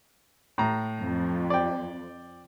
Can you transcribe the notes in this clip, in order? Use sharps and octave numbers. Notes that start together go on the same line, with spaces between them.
A2 A#5
F2
D5 G5